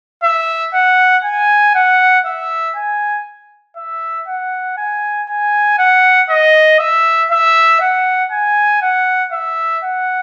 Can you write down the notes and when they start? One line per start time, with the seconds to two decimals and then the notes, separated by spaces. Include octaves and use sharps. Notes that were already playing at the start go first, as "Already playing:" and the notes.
0.23 E5
0.74 F#5
1.25 G#5
1.75 F#5
2.26 E5
2.76 G#5
3.77 E5
4.28 F#5
4.78 G#5
5.29 G#5
5.79 F#5
6.29 D#5
6.80 E5
7.31 E5
7.81 F#5
8.32 G#5
8.82 F#5
9.33 E5
9.83 F#5